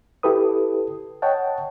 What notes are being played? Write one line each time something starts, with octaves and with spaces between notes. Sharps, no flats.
E4 G4 A4 B4 D#6
C#5 D#5 F#5 G5 A5